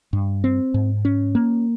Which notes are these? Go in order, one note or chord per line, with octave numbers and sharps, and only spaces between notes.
G2
C4
G#2
C#4
A#3